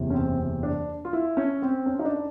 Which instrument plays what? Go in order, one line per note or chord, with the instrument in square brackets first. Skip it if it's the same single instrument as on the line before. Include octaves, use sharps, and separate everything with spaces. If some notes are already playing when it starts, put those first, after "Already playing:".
Already playing: [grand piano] F#1 E2 C3
C#4
C4
C4
D4
F4
E4
C#4
C4
C#4
D#4
D4